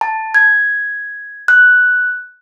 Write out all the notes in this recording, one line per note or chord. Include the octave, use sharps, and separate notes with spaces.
A5
G#6
F#6